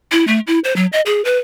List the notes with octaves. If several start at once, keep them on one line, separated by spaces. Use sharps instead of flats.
E4
A3
E4
C5
F#3
D#5
G#4
B4